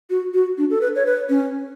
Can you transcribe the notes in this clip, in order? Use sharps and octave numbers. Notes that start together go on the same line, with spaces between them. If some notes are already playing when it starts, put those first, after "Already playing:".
F#4
F#4
D4
A4
B4
C#5
B4
C#4